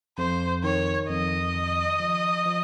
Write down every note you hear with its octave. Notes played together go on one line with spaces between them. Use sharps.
F2 C5
D#3 C#5
F2 D#5
D#3
F3
F3